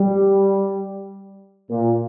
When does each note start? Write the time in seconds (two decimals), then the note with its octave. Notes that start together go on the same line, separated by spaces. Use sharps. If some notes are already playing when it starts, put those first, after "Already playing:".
Already playing: G3
1.70 A#2